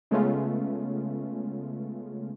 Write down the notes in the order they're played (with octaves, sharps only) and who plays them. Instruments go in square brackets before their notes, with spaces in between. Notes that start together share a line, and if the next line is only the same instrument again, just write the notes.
[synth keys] C#3 G#3 A3 B3 C#4 F4